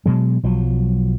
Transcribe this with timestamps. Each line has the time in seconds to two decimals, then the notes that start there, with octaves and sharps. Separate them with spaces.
0.06 B2 F#3 G#3
0.43 B1 F3 F#3